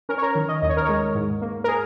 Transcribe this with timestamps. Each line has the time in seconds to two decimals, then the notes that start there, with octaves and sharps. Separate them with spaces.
0.09 C#4 A#4
0.18 C#5
0.22 A#4
0.35 D#3
0.49 D#5
0.62 D#2 D#5
0.70 C#5
0.77 A#4
0.85 G#3 C#5
1.15 G#2
1.41 A#3
1.64 A#4
1.68 G#4